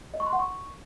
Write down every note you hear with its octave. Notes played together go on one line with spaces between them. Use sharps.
D#5
C#6
C6
F#5
C#6